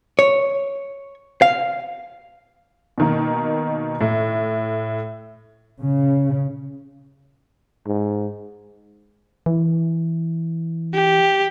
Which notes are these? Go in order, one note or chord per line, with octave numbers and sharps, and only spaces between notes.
C#5
F5
B2 D#3 A#3
A2
C#3
G#2
E3
G4